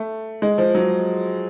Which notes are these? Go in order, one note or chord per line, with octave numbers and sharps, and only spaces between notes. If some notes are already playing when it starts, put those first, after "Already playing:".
Already playing: A3
G#3
F3
F#3